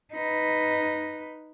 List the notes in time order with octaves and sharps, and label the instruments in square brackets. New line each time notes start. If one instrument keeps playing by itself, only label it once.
[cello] D#4 B4